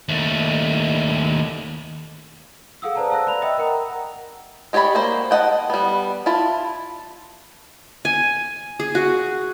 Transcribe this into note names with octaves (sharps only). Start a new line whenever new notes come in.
D#2 A3
G#4 A4 F5 F#5 D#6 E6
B4 C5 D5 A5 A#5
F5 A5 E6 F#6 A#6
D5 A#5 B5 F7
D#5 E5 G5 B5 D#6 E6
A#4 F#5 G5 A#5
G#3 G4 C#5 D5 B5
A#3 F#4 C5
A4 D#5 F#5 G5
G3 B3
E4 F4 A5
G#5
G#4
F#4